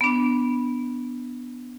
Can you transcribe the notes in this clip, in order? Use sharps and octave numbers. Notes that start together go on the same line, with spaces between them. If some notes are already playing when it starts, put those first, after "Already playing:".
B3 D4